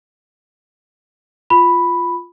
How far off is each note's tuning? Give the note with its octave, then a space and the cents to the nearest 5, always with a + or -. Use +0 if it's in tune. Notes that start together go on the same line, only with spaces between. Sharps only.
F4 +0 B5 +0